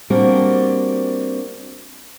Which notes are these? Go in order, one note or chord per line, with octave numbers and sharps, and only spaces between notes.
G3 A#3 C4 D4 F#4